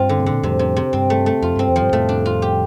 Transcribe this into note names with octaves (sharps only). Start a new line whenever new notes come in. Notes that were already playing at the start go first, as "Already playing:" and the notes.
Already playing: G2 C4 F4
D3
C3
A#2 D3
F2 A2 C3
C3
C3
G2 C4
A3
A3
F2 F4
G2 C4
F2
G2 F3
F2 A2 A3
D4
F4
G4